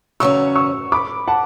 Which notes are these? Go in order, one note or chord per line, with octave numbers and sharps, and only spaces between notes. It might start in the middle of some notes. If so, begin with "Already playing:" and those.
E2 C#3 F#3 C#4 C#6 E6
C#6 E6
B5 D6
F#5 A5